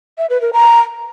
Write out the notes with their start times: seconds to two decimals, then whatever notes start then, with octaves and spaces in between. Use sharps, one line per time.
0.18 E5
0.30 B4
0.41 A#4
0.53 A#5